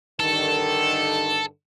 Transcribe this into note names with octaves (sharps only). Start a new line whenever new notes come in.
G2 D3 D#3 A4